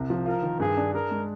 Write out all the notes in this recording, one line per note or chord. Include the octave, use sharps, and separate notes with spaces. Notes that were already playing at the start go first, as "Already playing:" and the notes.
Already playing: C2 C3
F3
F4 A#4
D#3
G2 G#4
D4
G#4 A#4
G#3